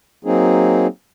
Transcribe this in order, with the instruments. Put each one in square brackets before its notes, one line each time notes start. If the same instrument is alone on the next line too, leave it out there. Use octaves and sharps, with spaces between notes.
[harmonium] F#3 A#3 C4 D#4 G#4